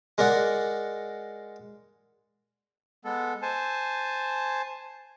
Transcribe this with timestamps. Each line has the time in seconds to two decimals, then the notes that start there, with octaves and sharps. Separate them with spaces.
0.18 G#3 A#4 D5 F#5
3.05 G#3 B3 A4
3.42 C5 G#5 A5